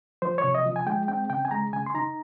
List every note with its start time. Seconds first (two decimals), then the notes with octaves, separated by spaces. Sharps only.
0.22 F3 C5
0.38 C#5
0.44 C3
0.54 D#5
0.66 F3
0.76 G#5
0.87 G#3 G5
1.08 C4 G5
1.30 C#3 G5
1.45 G#5
1.51 G#3 A#5
1.73 C#3 G#5
1.86 C6
1.94 D#4 A#5